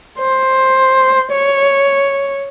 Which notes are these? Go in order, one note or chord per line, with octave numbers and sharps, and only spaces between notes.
C5
C#5